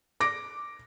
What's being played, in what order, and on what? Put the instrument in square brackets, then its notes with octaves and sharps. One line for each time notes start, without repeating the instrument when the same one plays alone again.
[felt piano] D6 A#6 D7